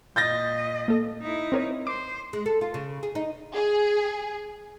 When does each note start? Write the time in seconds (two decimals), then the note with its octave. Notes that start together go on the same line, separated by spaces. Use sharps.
0.16 A#2 D#5 G6 A6 A#6
0.88 A#3 A4
1.22 D#4 E4
1.52 C4 A#4 C#5
1.87 C5 D6
2.33 G#3
2.46 A4
2.61 F4
2.74 C#3
3.03 G#4
3.15 D#4
3.54 G#4